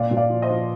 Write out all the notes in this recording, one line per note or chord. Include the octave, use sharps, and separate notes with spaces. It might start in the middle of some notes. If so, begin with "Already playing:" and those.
Already playing: A#2 D5 F5
A#2
D5 F5
F3
C5 D#5
F3